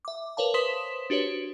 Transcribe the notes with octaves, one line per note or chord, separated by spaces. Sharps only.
E5 D6
A#4 B4 C#5 F5 A5
B4 C5 C6 D#6 B6 E7
D4 F#4 G4 B4 C#5